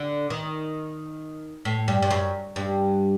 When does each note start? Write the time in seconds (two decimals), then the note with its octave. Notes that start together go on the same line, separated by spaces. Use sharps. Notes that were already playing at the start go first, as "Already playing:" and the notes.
Already playing: D3
0.30 D#3
1.65 A2
1.88 G2
2.02 G2
2.10 F#2
2.56 G2